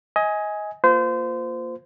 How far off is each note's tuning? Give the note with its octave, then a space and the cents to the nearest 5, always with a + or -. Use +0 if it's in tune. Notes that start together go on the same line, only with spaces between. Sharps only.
D#5 +25 G#5 +0
A#3 -5 F4 +0 C5 -30